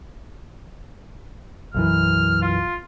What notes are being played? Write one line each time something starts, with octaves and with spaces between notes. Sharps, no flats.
B1 F#2 E3 F6
F4